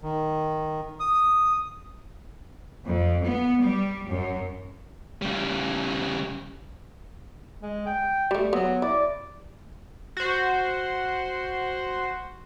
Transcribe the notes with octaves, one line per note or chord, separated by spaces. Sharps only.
D#3
D#6
F2
B3
G3
F#2
C#3 G3
G#3
G5
G3 A3
F#3 B3
E4 D5
F#4 C5